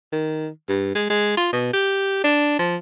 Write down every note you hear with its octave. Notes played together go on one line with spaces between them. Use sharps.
D#3
G2
G#3
G#3
F4
B2
G4
D4
F3